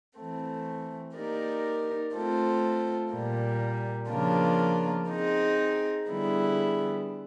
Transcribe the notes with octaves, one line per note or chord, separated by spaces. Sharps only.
E3 A3 C4
A#3 D#4 G4 A#4 D5
A3 C4 F4 A4 C5
A#2 G3 A#3
C#3 F3 A#3 D4 F4
C4 D#4 G#4
D3 G3 B3 E4 G#4